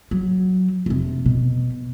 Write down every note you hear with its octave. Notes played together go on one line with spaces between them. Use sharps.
F#3
F1 C3
B2